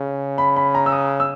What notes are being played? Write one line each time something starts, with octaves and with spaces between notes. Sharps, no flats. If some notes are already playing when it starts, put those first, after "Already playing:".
Already playing: C#3
B5
B5
A#5
E6
D#6
E6